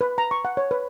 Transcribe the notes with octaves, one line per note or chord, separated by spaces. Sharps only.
B4
A#5
C#6
F#5
C#5
B4